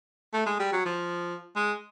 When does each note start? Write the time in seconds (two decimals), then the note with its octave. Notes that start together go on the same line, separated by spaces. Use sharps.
0.34 A3
0.46 G#3
0.60 G3
0.73 F#3
0.86 F3
1.56 G#3